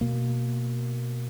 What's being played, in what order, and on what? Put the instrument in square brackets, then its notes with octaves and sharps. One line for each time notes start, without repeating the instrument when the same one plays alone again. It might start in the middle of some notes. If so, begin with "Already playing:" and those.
[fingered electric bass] B2 A#3